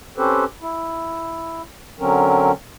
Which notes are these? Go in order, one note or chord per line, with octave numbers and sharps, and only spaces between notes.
C4 C#4 G4 A4 B4 C5
E4
D3 F#3 C4 C#4 A#4